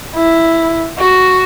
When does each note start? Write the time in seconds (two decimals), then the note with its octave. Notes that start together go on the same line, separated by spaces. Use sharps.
0.15 E4
0.99 F#4